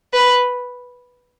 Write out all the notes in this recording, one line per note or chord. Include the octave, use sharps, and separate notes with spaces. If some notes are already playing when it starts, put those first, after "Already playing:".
B4